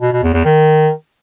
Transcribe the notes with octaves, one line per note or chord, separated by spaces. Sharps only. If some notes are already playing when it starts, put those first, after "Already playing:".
B2
B2
E2
E2
D#3